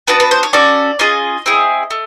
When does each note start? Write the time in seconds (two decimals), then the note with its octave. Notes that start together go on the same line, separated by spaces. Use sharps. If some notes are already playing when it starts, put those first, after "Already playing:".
0.07 B3 D4 F#4 B4
0.20 B4
0.31 C5
0.43 C#5
0.53 C#4 F#4 A4 D5
0.99 C#4 F4 G#4 D#5
1.46 C4 E4 G#4
1.91 A3